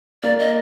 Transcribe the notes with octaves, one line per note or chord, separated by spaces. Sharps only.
A#3 D5
D#5